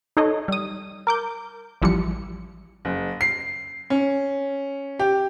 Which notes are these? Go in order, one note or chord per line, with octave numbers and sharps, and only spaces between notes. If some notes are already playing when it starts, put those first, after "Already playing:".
D#4 A4 C#5 D#5
G3 D#6
A#4 D6 G6
A1 E3 F3 G3 C#7
F#1
C7
C#4
G4